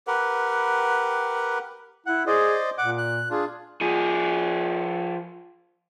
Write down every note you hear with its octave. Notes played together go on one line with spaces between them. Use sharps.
G4 A#4 B4 F#5
E4 F#5
G#4 C5 D5 D#5
A#2 F#5 D6
F#6
D4 F4 G#4
F3 G#4